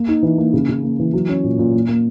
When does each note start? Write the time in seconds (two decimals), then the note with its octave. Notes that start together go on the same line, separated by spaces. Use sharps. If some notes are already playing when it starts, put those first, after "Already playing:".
Already playing: A#3
0.08 D#4
0.23 E3
0.38 A#3
0.53 C#3
0.69 C#3
0.83 A#3
0.99 E3
1.13 F#3
1.29 C#4
1.44 A#2
1.59 A#2
1.73 A#3
1.88 A#3